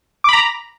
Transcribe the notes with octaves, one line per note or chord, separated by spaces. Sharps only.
A#5 B5 D6